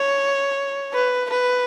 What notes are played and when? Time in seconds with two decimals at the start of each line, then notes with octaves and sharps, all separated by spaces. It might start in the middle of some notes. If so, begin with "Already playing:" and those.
Already playing: C#5
0.94 B4
1.30 B4